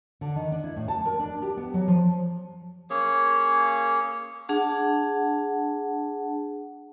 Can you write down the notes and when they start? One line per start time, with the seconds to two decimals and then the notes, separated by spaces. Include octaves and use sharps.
0.21 D3
0.35 D#3
0.52 D4
0.64 E4
0.76 A2
0.88 A5
1.06 A#4
1.19 D4
1.42 G4
1.57 B3
1.74 F#3
1.88 F3
2.90 A#3 C#4 G#4 C#5
4.49 D4 G#4 F#5 A5